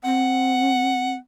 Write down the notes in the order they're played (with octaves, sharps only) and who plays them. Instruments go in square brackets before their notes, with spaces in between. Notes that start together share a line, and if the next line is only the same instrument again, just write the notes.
[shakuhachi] C4 [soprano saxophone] F#5